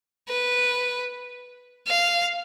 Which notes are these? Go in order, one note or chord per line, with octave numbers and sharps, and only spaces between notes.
B4
F5